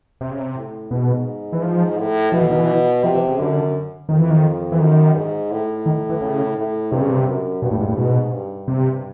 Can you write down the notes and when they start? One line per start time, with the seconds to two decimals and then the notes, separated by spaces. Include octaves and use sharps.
0.21 C3
0.31 C#3
0.40 C3
0.56 A2
0.91 G#2 B2
1.52 E3
1.62 F3
1.98 A2
2.32 B2 F3
2.41 E3
2.51 D#3
2.58 E3
3.03 C3 F3
3.15 E3
3.28 C#3
3.38 F#2 D3
4.09 F2 D#3
4.19 E3
4.30 D#3
4.72 E3
4.80 F#2 D#3
5.15 G#2
5.51 A2
5.86 D#3
6.10 E3
6.21 C#3
6.57 A2
6.92 G2 C3
7.01 C#3
7.09 C3
7.27 F#2
7.62 G2 B2
7.71 A2
7.80 G#2
7.89 A2
7.97 G#2 B2
8.33 G2
8.68 C3